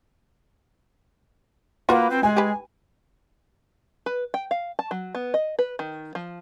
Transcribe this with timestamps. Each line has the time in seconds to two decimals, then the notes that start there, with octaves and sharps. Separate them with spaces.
1.89 A#3 F4 F#4 B4
2.10 C4
2.23 G#3 G#5
2.36 G4 B4
4.06 B4
4.34 G5
4.51 F5
4.79 A5
4.91 F#3
5.15 B3
5.34 D#5
5.59 B4
5.79 D#3
6.15 F3